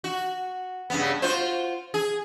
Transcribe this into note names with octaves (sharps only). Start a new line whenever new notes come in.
F#4
G2 C#3 B3
F4 F#4 C5
G#4